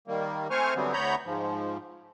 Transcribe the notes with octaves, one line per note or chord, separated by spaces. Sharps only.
D#3 G3 A#3
A3 C4 C5 G#5 C#6 F6
D3 E3 F#3 G3 B3 C4
D2 B3 C#5 A#5 B5 G6
G#2 F3